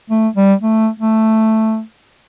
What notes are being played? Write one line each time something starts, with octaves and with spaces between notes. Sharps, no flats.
A3
G3
A3
A3